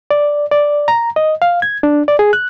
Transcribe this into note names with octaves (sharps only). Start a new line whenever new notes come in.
D5
D5
A#5
D#5
F5
G#6
D4
D5
G#4
F#6